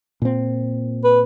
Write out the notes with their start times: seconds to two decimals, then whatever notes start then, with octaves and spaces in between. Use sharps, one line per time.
0.22 A#2 C4
1.04 B4